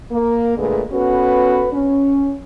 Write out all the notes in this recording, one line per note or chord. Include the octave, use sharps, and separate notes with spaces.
A#3
A#2 D3 G#3 A3 G#4 B4
B3 C#4 F#4 A4 B4
C#4